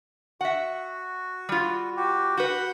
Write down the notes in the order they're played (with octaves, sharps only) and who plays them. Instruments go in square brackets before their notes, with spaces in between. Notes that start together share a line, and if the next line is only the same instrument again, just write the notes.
[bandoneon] F#4 [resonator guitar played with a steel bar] E5 F#5
[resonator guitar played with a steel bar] G3 F4
[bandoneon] F#4 G4
[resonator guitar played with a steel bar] F#4 B4 [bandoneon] F#5 G6